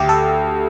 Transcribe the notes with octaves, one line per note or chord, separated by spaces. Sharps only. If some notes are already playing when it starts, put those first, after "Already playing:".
Already playing: D2 G4
A4